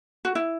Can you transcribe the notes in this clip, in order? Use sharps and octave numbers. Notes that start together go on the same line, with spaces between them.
F#4
E4